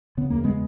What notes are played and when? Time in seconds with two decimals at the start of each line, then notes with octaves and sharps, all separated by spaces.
0.17 C#3 B3
0.30 E2 A#3
0.44 C#3 G#3 B3